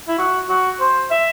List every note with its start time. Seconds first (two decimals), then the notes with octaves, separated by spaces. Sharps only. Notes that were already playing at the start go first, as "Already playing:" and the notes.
0.08 E4
0.18 F#4
0.49 F#4
0.80 C5
1.11 E5